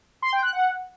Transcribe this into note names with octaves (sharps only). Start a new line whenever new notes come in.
C6
G5
F#6
F#5